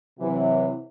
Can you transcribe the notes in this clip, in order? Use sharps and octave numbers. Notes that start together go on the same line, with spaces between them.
C3 E3 F#3